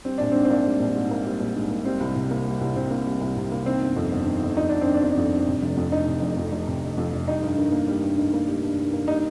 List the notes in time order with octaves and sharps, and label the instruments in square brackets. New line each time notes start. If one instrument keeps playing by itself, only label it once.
[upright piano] G3 C4
A#1 D4
G#2 C4
C4
A#3 D4
G3
A#1
G#2
A#3
G3
A#1
G#2
A#3
G3 C4
C2
C3
A#3
G3
C2
C3 C4
A#3
G3
C2
C3
A#3
D#3 C4
G1
F2
G1
D#3
G1
F2 D#4
G1 D4
D#3 C4
D4
G1
F2
G1
C3
F1
F2
F1 D#4
C3
F1
F2
F1
C3
F1
F2
F1
G3 D#4
G2
D#3
A#3
G3
G2
D#3
A#3
G3
G2
D#3
A#3
G3 D#4